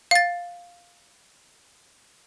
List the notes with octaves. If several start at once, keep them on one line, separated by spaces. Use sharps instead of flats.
F5 A6